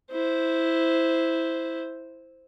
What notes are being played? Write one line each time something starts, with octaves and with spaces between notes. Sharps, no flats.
E4 C5